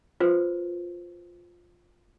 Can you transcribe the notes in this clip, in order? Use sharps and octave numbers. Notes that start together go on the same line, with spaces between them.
F4 B4 C5